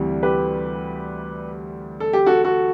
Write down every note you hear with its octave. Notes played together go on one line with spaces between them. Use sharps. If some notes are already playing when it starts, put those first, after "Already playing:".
Already playing: D2 C3 E3 G3
G4 B4
A4
G4
F#4 A4
F#4 A4